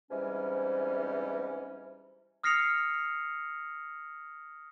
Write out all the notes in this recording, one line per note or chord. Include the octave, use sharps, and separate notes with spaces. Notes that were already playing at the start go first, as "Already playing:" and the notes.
G#2 C3 E3 G3 C#4
D#6 F6 A#6 C7 C#7 F7